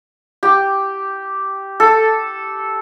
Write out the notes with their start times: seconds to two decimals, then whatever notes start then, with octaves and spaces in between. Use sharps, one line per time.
0.43 G4
1.80 A4